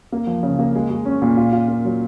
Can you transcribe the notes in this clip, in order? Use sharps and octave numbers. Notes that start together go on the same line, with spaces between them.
A#3
F3
C#3
A#3
G#3
G#3
C#4
A#2
F4
F4
A#3
F#3